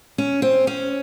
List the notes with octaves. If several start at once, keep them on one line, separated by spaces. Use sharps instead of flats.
C#4
C4
C#4